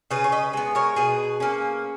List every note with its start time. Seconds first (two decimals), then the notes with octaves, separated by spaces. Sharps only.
0.11 C#3 G#4 B4
0.24 C#5
0.32 B4 D#5
0.53 G#3 B3
0.75 A#4 C#5
0.96 B2 G#4 B4
1.40 A#3 C#4